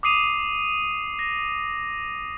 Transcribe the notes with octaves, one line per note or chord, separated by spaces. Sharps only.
D6 D#6 C7 D#7 F7
A#6